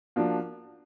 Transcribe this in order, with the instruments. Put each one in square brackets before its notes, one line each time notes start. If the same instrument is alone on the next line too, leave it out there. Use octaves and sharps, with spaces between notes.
[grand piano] F3 A#3 D4 F#4